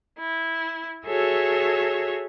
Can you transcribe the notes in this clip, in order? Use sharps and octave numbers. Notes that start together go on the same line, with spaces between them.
E4
F#4 G#4 A4 C#5 E5